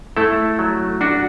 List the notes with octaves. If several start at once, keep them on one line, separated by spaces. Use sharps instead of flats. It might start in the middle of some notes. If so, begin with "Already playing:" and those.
A3 E4 A4
F#3
D4 F#4